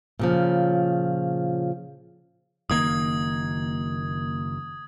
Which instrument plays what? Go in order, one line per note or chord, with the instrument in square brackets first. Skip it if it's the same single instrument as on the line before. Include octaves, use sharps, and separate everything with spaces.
[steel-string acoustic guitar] A#2 C#3 F3
[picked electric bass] F#1 D#3 A#3 [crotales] D#6 G#6